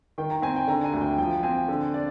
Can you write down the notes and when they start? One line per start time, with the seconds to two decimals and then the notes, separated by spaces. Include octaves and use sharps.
0.18 D#3 G5
0.30 A#5
0.42 C4 G#5
0.56 G5
0.67 D3 A#5
0.84 G#5
0.93 D2
1.01 G5
1.18 F3 G5
1.43 C4 G#5
1.68 D3
1.94 D4 D5